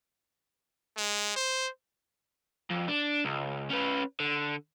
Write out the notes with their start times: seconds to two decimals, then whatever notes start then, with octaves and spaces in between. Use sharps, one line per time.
0.97 G#3
1.36 C5
2.70 F2
2.88 D4
3.25 C#2
3.70 C#4 B4
4.20 D3